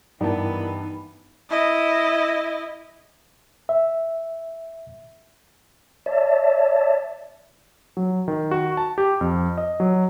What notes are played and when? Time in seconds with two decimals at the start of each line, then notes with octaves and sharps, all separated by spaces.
0.21 G2 E3 B3 D#4 E4 A#4 D5 A5
1.50 E4 D#5
3.69 E5
6.06 C#5 D5 E5 A5
7.97 F#3
8.28 D#3
8.51 F#4
8.77 A5
8.98 G4
9.21 F2
9.58 D#5
9.80 F#3